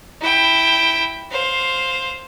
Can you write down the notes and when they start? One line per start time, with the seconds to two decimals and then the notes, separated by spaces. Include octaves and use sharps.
0.21 E4 G5
1.30 C5 F5